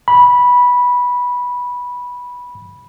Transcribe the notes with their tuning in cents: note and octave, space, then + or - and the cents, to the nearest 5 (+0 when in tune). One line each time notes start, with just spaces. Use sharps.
B5 -10